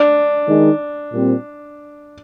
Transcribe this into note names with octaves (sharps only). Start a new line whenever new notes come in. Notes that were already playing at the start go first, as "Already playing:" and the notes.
Already playing: D4
D#3 G#3 D#4
A#2 G3 C4